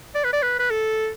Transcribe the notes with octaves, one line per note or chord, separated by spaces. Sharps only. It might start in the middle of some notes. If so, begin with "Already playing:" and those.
D5
B4
D5
B4
B4
A4